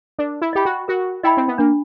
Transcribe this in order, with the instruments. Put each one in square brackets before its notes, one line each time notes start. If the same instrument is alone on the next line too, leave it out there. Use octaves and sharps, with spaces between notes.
[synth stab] D4 [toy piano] A#4
[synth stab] E4
[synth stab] G4 [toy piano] D#5 G5 B5
[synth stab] F#4
[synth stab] F#4 [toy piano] A#4
[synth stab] E4 [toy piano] D#5 G5 B5
[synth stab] C4
B3
[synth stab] A#3 [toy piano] D4